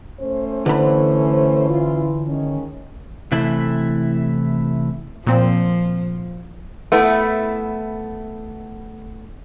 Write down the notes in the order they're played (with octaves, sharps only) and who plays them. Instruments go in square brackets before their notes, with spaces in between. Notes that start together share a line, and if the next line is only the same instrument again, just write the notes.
[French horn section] A3 C#4 C5
[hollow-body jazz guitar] D3 B5 [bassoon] E3
[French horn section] C#4 E4 F4
D#3 G#3 C#4
[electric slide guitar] C3 E3 A3 E4
[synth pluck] A#2 C4 [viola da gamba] F3
[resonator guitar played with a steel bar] A3 B3 E4